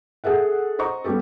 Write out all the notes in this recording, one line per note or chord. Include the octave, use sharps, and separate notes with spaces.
G#4 A4 E5 F#5
C5 D#5 A#5 C#6
G3 B3 C#4 G4 A4